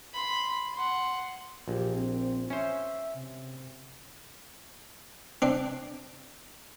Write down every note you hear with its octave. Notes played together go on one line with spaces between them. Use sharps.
B5 C6
F#5 C6
A#1 G4
C4
C#4 C5 E5
C3
C4 D4